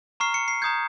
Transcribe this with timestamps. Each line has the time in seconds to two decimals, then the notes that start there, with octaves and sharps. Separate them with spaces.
0.20 A#5 C#6 F6 C7
0.34 C#7
0.48 C7
0.62 A#5 D#6 G6 G#6